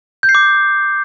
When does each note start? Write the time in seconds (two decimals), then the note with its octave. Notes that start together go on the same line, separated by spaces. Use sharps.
0.23 G6
0.29 C7
0.35 D6